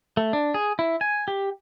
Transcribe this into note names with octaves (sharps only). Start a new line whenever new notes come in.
A3
D4
G#4
E4
G#5
G4